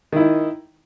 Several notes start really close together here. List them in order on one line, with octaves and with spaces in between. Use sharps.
D#3 E4 D#4